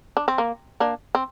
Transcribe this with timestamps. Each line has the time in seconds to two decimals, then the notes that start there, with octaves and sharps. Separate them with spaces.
0.17 D4
0.28 C4
0.38 A#3
0.80 A#3 D4
1.15 C4